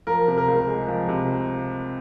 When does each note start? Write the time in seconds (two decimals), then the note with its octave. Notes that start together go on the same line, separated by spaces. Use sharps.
0.07 F3 A#4
0.28 C3
0.38 A#4
0.48 C#2
0.68 G#3
0.88 F3
1.09 C3